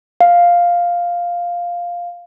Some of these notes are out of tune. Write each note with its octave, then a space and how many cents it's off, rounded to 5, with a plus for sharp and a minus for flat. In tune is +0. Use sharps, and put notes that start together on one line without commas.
F5 +0